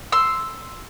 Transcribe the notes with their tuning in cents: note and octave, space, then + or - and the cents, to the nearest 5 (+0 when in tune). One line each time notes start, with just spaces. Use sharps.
C6 +0 E6 +0